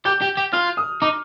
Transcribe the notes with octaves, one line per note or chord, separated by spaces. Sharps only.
G4 G6
G4
G4
F4 F6
D#6
D#4 D6